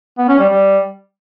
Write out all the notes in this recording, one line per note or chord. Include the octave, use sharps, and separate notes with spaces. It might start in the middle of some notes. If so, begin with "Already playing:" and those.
B3
C#4
G3
G3